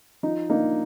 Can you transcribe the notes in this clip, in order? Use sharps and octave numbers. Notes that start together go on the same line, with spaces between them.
F3 D#4
A#3 D4 D#4